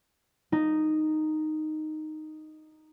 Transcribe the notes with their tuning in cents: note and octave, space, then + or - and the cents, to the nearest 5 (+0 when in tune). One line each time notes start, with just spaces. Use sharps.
D#4 -5